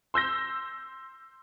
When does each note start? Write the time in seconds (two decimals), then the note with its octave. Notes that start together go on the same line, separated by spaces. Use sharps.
0.14 C6 E6 G6 A#6